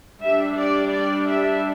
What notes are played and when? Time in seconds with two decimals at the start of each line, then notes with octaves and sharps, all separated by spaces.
0.22 G3 D4 E5
0.56 D5
0.91 D5
1.25 E5